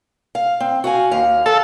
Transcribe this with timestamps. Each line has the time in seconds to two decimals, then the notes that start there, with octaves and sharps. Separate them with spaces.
0.35 F5
0.60 C4
0.84 F#4 F5 G#5
1.11 D#2 F5
1.46 A4 F5